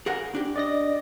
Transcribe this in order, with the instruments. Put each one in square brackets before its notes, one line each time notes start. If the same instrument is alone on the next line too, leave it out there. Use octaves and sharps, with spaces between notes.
[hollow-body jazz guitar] G#4 A#4 F#5
D4 G4
[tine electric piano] D5 D#5 A#6